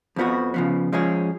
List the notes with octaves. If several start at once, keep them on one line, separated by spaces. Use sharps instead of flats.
F2 F3 B3 F#4
C#3 F3 B3
F3 G#3 C#4 G#4